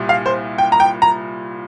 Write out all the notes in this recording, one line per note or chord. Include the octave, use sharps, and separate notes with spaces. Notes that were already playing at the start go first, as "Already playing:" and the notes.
Already playing: C2 A#2 G3
F5
C5
G5
A#5
G5
A#5